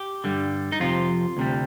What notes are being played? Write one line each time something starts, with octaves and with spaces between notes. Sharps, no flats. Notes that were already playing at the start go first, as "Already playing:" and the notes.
Already playing: G4
G2 D3 G3
D#4
F2 C3 F3 F4
D2 C3 G3